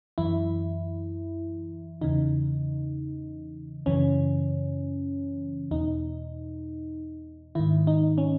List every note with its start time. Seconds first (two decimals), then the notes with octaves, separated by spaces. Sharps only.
0.18 F#2 E3 E4
2.01 E2 C#3 E3 D#4
3.86 F#2 C#3 E3 C#4
5.71 E2 B2 D#4
7.55 G#2 D#3 E4
7.87 D#4
8.18 C#4